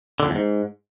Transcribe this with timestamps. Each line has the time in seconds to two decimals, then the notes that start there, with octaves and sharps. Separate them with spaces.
0.20 D3
0.25 F2
0.30 E2
0.35 G#2